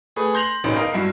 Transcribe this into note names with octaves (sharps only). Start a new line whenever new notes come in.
A3 G#4 B4
C6 G6 A#6 F7 F#7
E1 A1 C#4 D#4 D7
A#4 D#5 F5
G2 E4 F#4 C7